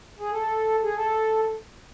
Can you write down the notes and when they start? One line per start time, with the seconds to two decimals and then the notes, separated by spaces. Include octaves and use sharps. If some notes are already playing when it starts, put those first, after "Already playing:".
0.19 G#4
0.31 A4
0.83 G#4
0.96 A4